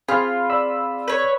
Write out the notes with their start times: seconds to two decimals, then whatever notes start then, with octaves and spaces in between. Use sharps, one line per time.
0.08 C4 F4 G#4 B5 F6
0.50 D5 B5 E6
1.08 B4 C#5